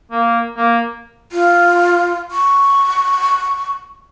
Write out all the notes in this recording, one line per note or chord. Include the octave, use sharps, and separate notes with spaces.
A#3
A#3
F4
C#6